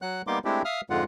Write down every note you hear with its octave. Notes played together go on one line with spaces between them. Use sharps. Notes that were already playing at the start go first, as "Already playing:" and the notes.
F#3 F#5 F#6
G3 A#3 B3 D#4 C6 D6
G#3 A3 C4 D4 E4 G4
E5 F5 D#6 F6
F2 G#2 D3 G#3 F4 F#5